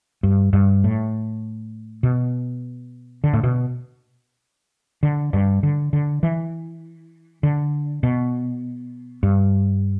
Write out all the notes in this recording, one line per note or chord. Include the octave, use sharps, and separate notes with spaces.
G2
G2
A2
B2
D3
A2
B2
D3
G2
D3
D3
E3
D3
B2
G2